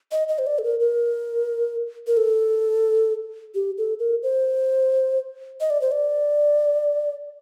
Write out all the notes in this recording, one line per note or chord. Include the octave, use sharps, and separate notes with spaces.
D#5
D#5
C5
D5
A4
A#4
A#4
A#4
A4
G4
A4
A#4
C5
D#5
D5
C5
D5